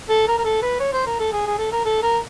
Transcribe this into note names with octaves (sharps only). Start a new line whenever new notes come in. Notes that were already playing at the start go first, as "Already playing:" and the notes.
A4
A#4
A#4
A4
B4
C#5
C5
A#4
A4
G#4
G#4
A4
A#4
A4
A#4